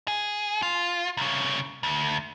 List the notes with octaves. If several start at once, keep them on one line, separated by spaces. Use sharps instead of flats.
G#4
F4
C2 C#3
D2